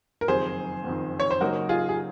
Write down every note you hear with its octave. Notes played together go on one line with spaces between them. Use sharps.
A#4
F#1 F2 D#3 G#4 C5
F#1 F2 D#3
C#5
C5
C#3 F#3 A#3 D#4 F#4 A#4
F4 G#4
G#4